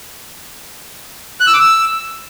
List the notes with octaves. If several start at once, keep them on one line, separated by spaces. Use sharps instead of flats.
F#6
E6
D6
E6